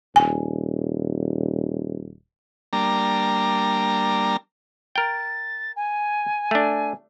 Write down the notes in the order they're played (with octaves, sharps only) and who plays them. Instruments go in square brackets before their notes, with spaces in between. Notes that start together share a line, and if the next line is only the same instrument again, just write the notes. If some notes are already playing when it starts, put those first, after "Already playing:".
[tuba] D#1 [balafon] G#5
[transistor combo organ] G3 A#3 D4 A#5
[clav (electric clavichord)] A#4 G5 [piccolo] A6
[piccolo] G#5
[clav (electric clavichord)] A3 D4